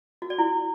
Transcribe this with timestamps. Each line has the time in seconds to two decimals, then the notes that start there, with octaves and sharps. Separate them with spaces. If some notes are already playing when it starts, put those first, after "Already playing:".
0.22 F#4
0.30 D5
0.38 E4